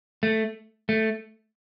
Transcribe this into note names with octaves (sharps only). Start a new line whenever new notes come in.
A3
A3